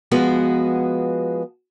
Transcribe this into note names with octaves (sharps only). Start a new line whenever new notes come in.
F3 G#3 B3 F#4 G#4